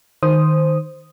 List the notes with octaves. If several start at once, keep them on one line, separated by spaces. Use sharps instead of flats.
D#3 C5 D#6